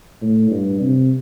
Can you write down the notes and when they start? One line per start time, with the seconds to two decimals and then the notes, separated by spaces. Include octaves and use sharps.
0.21 A2
0.51 G2
0.80 C3